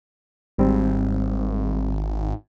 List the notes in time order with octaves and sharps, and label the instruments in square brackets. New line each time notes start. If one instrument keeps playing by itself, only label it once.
[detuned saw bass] G#1 [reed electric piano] G#2 G3 C4